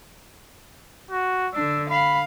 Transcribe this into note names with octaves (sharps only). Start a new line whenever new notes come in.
F#4
D3 D4 E6
F5 B5